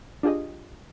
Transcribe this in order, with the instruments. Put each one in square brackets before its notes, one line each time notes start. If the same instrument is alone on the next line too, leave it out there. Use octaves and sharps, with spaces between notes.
[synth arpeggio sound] D4 F4 G4 G#4 D#5